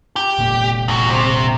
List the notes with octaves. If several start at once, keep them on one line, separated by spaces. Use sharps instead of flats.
G4
F1 A#2 A#3
E2 F#4
C3